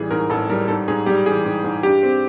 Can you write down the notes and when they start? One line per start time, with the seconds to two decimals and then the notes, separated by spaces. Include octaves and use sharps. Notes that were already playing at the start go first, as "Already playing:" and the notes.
Already playing: A1 E3 G3 G#4
0.11 G#2 A#4
0.30 A1 A4
0.49 G3 A#4
0.68 G#2 A4
0.88 G#2 G#4
1.06 G3 G4
1.26 E3 G#4
1.46 G#2
1.64 G#2
1.83 G2 G4
2.03 C4